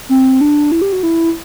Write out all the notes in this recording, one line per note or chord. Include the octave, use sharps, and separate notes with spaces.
C4
D4
E4
G4
F#4
E4